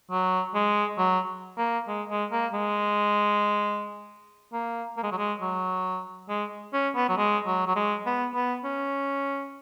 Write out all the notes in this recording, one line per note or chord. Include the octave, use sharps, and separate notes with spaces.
F#3
G#3
F#3
A#3
G#3
G#3
A#3
G#3
A#3
A#3
G#3
F#3
G#3
F#3
G#3
C#4
B3
F#3
G#3
F#3
F#3
G#3
B3
B3
C#4